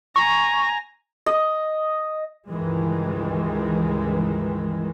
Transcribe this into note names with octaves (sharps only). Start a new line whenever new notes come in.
G#5 A#5 C#6
D#5
C#2 G2 D#3 E3 G#3